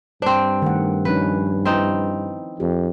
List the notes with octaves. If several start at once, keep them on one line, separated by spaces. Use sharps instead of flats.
G2 C4 D4 C5
D#3 A3 F#5
F3 C#4 D#4 B4
C4 D#4 E4 B4 C5
F2 G4